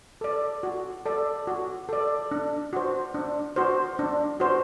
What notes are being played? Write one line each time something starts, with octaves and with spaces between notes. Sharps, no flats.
A4 D5
F#4
A4 D5
F#4
A4 D5
D4
F#4 C5
D4
F#4 C5
D4
F#4 C5